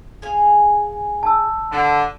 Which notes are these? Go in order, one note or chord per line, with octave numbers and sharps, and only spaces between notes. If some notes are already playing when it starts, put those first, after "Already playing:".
G#4 F5 G#5
A5 E6
D3 D4